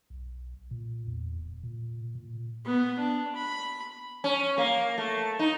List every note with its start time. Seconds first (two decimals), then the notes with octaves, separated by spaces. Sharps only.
0.10 B1
0.71 A#2
1.07 E2
1.38 D1
1.63 A#2
2.15 A#2
2.65 B3
2.98 D4
3.35 B5
4.24 C#4
4.58 A#3
4.98 A3
5.39 D#4